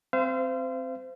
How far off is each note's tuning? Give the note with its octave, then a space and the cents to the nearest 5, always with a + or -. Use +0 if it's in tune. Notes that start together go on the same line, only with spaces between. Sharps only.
C4 +0 C5 -25 F5 -40